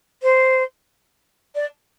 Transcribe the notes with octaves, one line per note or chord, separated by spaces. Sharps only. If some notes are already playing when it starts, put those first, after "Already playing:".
C5
D5